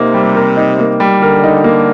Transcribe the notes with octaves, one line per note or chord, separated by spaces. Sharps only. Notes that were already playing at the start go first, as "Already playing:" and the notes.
Already playing: C3 A#3 D#4
G3
A#4
D#4
A#3
G3
D3 A#4
D#4
A#3